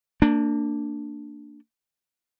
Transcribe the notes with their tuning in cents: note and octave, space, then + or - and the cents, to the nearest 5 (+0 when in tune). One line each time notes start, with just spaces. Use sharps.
A#3 -30 D4 +0